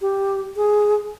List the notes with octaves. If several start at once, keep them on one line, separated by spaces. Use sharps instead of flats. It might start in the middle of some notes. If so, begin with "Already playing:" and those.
G4
G#4